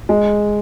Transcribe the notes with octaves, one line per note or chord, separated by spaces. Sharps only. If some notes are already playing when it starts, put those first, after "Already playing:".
G#3